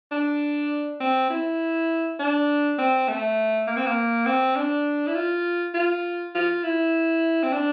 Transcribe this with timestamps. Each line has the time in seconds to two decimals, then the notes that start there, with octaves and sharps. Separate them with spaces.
0.11 D4
1.00 C4
1.30 E4
2.19 D4
2.78 C4
3.08 A3
3.67 A#3
3.77 C4
3.86 A#3
4.26 C4
4.56 D4
5.07 E4
5.15 F4
5.74 F4
6.35 F4
6.64 E4
7.43 C4
7.53 D4